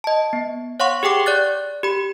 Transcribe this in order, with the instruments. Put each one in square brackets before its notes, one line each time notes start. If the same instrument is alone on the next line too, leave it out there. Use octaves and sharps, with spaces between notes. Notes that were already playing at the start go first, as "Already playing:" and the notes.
[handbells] D#5 A5
B3
C#5 F5 F#5 C6 C#6
G4 G#4 G5 D6
D5 F#6 A6
G4 B5